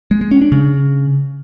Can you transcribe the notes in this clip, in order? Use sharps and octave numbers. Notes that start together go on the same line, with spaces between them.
G#3
G#3
C#4
D4
C#3